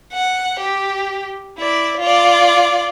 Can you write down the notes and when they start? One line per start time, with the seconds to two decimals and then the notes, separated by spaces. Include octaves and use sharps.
0.13 F#5
0.59 G4
1.58 E4 D5
2.00 F4 D5